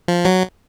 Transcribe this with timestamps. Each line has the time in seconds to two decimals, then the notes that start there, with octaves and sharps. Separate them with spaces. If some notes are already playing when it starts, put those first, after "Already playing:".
0.08 F3
0.25 F#3